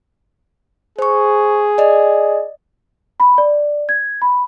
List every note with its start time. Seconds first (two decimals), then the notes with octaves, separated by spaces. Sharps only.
0.99 G#4 C5 C#6
1.78 D5 D#5
3.20 B5
3.38 D5
3.89 G#6
4.22 B5